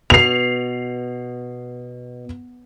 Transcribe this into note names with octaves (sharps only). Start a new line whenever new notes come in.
B2 C7 F7